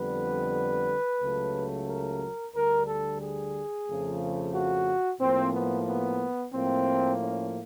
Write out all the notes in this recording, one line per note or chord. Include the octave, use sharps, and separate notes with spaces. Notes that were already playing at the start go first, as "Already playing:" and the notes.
Already playing: F2 D3 G3 B3 B4
C#2 C#3 F#3 A3
A#4
D2 D3 G3 A#4
A4
G#4
F2 C#3 F3 A3
F#4
A2 F3 A#3 C4
B3
B3
A2 F3 A#3 C4
C#4